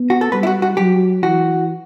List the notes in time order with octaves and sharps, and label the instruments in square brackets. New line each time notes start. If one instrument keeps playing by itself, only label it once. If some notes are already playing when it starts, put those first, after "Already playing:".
Already playing: [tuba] B3
[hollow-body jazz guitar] F#4
A4
[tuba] G3 [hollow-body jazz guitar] B4
[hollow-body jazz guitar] E4
F#4
F#4
[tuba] F#3 [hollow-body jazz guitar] G4
[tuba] E3 [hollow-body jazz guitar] F#4